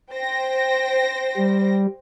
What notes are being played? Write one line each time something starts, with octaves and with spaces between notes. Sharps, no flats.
C5 G5 A#6
G3